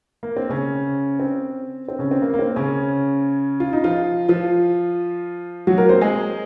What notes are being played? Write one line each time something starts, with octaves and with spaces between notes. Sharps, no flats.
A#3
C4
C#3 C#4
C4
C4
C#3 C#4
C4
A#3
A#3
C4
C#3 C#4
F4
D#4
F3 F4
F3 F4
F#3 F#4
A#3 A#4
C4 C5
G#3 G#4